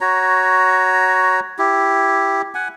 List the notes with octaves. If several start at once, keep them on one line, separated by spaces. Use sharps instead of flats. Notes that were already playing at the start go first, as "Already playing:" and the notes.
F#4 C#5 A#5
E4 G4
F#5 G#5